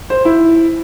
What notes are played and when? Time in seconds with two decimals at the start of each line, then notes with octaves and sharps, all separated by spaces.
0.10 C5
0.25 E4